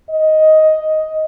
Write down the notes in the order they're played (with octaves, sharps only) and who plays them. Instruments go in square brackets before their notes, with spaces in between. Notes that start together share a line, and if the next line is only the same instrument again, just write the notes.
[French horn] D#5